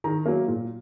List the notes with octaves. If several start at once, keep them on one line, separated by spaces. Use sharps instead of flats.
D#3 A#5
F#3 A#3
A#2